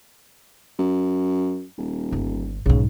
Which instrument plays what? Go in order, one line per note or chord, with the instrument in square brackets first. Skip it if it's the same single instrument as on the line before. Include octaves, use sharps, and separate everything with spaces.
[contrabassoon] F#2
D#1
[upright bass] G1
[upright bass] B1 G#2 [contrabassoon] C#3